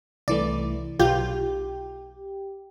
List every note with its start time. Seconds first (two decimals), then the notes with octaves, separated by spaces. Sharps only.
0.28 C2 E3 A3 D5
0.99 B1 F4 G4 G6